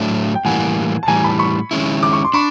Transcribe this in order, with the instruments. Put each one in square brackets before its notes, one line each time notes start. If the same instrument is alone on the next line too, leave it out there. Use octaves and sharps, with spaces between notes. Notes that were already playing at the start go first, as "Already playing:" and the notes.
Already playing: [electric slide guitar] A2 F#3 A3 D4
[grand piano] G5
[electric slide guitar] A2 E3 G3 A#3 [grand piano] F#5 G#5
[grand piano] A5
[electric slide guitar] A2 E3 G3 [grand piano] G#5 A#5
[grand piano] A5 B5
B5 C#6
[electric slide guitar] D#3 G#3 C#4 E4
[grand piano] D6
C#6
C6
[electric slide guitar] D4 [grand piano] B5 C#6